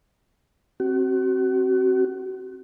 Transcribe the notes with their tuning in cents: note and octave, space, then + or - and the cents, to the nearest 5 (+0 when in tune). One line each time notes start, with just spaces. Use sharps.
C4 +20 F#4 +30